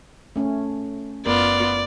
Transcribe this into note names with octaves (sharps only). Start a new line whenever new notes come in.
B2 A3 C#4
F#1 B3 F4 A#4 D5